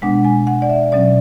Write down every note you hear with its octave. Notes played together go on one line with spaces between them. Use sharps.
B2 G#3 B3 D4 F#5
G#5
F#5
D5
E5
B2 F#3 C#4 D5